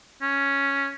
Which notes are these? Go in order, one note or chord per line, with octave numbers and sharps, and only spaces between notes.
C#4